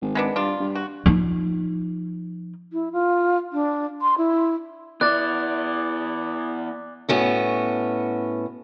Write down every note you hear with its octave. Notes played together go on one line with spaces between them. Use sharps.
G#1
G#3 B3 D4
G2 D4 F4
G2
F#4
F3 D#4
E4
F4
D4
C6
E4
B3 E4 D5 F#6 A6
A2 B3 C#4 F#4